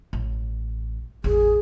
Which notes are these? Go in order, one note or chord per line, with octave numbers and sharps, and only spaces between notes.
A1
A1 F2 G#4